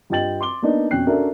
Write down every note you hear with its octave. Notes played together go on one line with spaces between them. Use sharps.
G2 F4 D#5 G5 A6 F#7
C6 D6 G7
A#3 B3 D4 D#4
F2 B2 C#4 G5 F#6 C7
C#4 D4 F#4 A4 A#4 E5